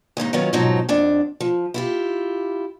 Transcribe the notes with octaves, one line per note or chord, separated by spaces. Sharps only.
D#2 G#2 C3 D#4
D#3 F#3 B3 C#4 F4
G#2 B2 F3 F#3 D#4
F2 D4 F#5
F3
E4 F4 G4